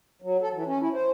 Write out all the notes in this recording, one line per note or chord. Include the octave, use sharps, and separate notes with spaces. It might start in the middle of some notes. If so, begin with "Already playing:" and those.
F#3
A4
E3
C#4
E4
C5